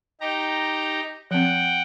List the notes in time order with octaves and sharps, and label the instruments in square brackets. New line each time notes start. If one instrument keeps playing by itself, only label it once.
[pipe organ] D#4 G4 A#5
[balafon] F3 C4 [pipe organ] F#5 G5